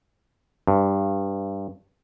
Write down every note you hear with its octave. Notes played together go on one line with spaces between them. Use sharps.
G2